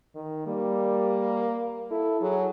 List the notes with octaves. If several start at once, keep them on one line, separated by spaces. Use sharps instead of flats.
D#3
G3 A#3
E4 A4
F#3 G#4